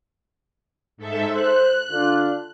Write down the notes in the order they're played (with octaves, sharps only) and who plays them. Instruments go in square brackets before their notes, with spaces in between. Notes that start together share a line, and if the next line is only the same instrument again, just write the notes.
[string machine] G#2 A4 E5
[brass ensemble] C5 [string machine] F#6
[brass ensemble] D3 D4 F4